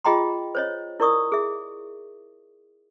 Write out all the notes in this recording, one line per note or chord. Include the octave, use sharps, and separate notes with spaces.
F4 G#4 D#5 G5 A#5 C6
C5 C#5 D#5
E4 A#4 D5 C#6 D#6
G#4 E5